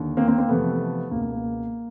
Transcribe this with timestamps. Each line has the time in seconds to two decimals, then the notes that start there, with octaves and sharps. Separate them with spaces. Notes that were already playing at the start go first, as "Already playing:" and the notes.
Already playing: D#2 D3
0.17 A#3 C4
0.28 A#3 C4
0.38 A#3 C4
0.49 F2 C3 E3 A3 B3
1.11 C#2 B2 A#3
1.22 A#3
1.32 A#3